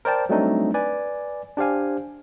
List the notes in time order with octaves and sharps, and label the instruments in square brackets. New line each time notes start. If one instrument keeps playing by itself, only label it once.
[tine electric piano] A#4 C5 D5 G5 A5
F#3 G3 A3 C4 D4 D#4
B4 D5 G#5
D4 G4 C5 F5 G#5